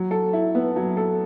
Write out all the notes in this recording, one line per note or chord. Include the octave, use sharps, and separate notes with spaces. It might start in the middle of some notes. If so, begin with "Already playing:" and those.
Already playing: F#3
A4
E4
B3
F#3
A4